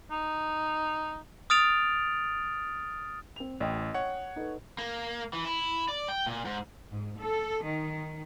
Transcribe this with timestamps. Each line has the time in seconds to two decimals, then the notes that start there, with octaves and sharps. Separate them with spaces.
0.11 D#4
1.50 D#6 F6 A6 D7 F7
3.36 C4 F7
3.60 A1 D#5 G5
3.94 C#5 F#5
4.36 D#4 A4 B4
4.78 A#3
5.33 E3
5.45 E4
5.88 D5
6.09 G5
6.27 A#2
6.45 G#2
6.90 G#2
7.19 A4
7.64 D#3